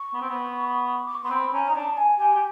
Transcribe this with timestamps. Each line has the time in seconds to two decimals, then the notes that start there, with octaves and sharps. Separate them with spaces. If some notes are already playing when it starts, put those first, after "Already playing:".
Already playing: C#6
0.14 B3
0.22 C4
0.29 B3
1.06 D6
1.14 C#6
1.23 B3 C6
1.30 C4 B5
1.53 C#4 A#5
1.65 D#4 A#5
1.75 D4 A5
1.97 G#5
2.19 G4 G#5
2.35 G4